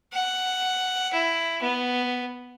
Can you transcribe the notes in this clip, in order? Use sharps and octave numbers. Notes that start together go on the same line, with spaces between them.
F#5
E4
B3